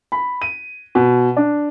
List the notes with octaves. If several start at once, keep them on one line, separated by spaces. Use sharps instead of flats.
B5
D#7
B2
D4